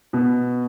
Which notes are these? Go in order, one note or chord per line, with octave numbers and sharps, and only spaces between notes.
B2